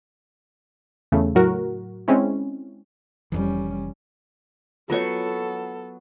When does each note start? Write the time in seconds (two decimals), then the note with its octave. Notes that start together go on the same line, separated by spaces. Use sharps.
1.12 E2 C#3 A3
1.35 A2 F#3 F#4 A#4
2.08 G#3 C4 C#4 E4
3.32 F1 F2 E3 G3 C#4
4.90 F#3 B3 F4 A4 C#5 C#6